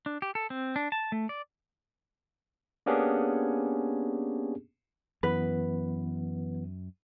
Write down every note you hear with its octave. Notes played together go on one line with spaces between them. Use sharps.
D4
G4
A4
C4
D4
A5
A3
D5
A#3 B3 C#4 D4 G4 G#4
F#2 E3 B3 B4